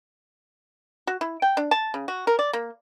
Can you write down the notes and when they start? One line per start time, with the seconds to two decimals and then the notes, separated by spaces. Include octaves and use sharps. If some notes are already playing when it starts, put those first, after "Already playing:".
1.07 F#4
1.21 E4
1.42 G5
1.57 D4
1.71 A5
1.94 C#3
2.08 F#4
2.27 A#4
2.39 D5
2.53 A#3